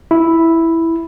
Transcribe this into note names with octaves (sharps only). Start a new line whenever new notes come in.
E4